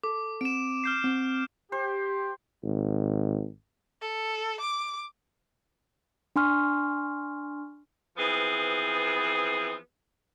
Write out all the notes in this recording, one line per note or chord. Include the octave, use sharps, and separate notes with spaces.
A4 D6
C4 D7 E7
F6 G6 C7
C4
G4 C5
G#1
A4
D6
D4 G#5 C6 C#6 F6
E3 F3 B3 C4 G#4